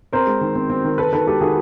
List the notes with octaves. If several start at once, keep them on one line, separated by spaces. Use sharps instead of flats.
C4 A#4 C5
G#3
D#3
C4
C4
D#3
D#3 A4 B4
D#3 A4 B4
G#3 G4 A4
D#3 F#4 G#4